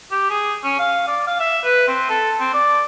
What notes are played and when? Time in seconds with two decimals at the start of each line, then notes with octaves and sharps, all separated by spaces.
0.11 G4
0.30 G#4
0.64 C#4
0.79 F5
1.07 D5
1.27 F5
1.40 E5
1.64 B4
1.88 C4
2.10 A4
2.40 C4
2.54 D5